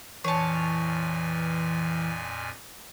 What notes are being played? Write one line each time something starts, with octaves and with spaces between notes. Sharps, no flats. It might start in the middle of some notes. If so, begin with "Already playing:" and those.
F2 A#2 E3 C#5 G#5 A5